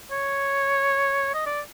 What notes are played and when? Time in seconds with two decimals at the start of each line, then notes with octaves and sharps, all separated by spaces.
0.11 C#5
1.34 D#5
1.46 D5